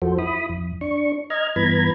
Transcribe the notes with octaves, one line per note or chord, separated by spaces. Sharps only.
F2 F3 F#4 A4 C5
E4 B5 D#6
F2
D4 C#6
D#5 A#5 F6 G#6
G2 E3 B3 A#5 B5 G#6